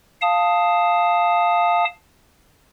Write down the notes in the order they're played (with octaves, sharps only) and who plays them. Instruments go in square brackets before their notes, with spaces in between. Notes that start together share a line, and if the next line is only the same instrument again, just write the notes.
[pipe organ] F5 A5 D#6